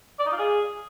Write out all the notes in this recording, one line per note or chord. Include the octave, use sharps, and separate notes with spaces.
D5
D#4
F4
G#4